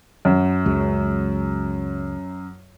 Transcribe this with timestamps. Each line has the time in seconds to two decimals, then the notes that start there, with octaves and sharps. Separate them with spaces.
0.25 F#2
0.66 C#2 F#3 G#3